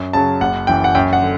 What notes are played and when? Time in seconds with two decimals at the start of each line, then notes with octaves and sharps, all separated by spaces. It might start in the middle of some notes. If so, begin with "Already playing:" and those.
Already playing: F#2
0.13 C#3 F#3 A5
0.41 F#1 F#5
0.67 F#2 E3 G5
0.84 F#5
0.95 F#2 G5
1.13 F#5
1.21 D3